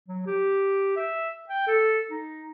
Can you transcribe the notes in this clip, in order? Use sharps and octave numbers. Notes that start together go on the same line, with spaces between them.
F#3
G4
E5
G5
A4
D#4